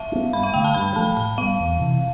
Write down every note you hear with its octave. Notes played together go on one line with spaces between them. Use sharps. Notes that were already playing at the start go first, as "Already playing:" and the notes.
Already playing: E5 F5 A5
D4
B3
G2 B5
F5
D3 A3 G5
A5
G2 B5
F3 A3 A5
A2 A5
G3 B3 F5
E2
C3 E3